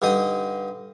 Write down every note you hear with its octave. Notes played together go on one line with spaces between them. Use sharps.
G2 D3 D#4 D#5 D#6